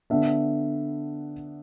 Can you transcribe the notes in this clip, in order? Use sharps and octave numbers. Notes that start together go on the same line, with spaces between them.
D3 B3 D4 E5